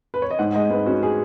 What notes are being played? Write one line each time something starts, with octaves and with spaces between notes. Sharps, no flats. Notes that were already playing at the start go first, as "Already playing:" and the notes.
B4
C#5
D#5
G#2 F#5
G#3 D#5
G#2 B4
C#4 F#4
G#4